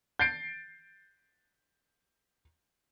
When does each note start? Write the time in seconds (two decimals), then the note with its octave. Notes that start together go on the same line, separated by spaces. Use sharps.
0.19 G6 A6 C7 D7